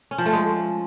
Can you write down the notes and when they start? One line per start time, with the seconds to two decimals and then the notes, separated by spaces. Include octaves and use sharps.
0.11 C#4
0.18 F3
0.26 A3
0.33 G#3